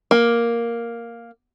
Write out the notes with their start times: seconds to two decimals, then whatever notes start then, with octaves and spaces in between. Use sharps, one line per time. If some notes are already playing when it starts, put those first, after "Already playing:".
0.11 A#3